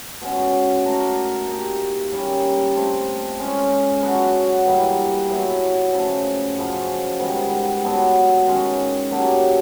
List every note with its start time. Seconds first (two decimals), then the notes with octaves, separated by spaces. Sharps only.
0.22 B2 G#3 C#4
0.85 A3 D4 F#4 A#4
1.48 A#3 D#4 G4
2.12 G3 A#3 C#4
2.75 A3 C4 F4
3.40 G#3 C#4 F4
4.02 F#3 B3 D4 F#4
4.66 G2 E3 G3 A#3
5.29 B2 F#3 B3 E4
5.93 C#3 F3 A3
6.57 F#2 C#3 F3
7.20 G#2 D#3 G3 B3
7.84 B2 F#3 B3 D4
8.47 D#3 G#3 C#4
9.11 F#3 A#3 D4 G4